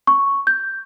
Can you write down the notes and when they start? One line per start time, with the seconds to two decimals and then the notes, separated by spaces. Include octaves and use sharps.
0.07 C#6
0.47 G6